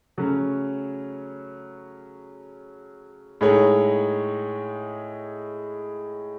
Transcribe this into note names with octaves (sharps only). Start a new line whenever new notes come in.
C#3 F#3 A3 C#4
A2 G#3 D#4 G#4 C#5